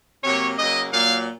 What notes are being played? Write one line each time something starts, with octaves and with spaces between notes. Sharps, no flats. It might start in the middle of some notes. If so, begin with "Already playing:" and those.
C3 F#3 A#3 C#5
C#3 F#3 A#3 D#5
A#2 F#3 A#3 F5